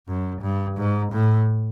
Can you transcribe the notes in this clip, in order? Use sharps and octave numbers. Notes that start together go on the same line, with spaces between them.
F#2
G2
G#2
A2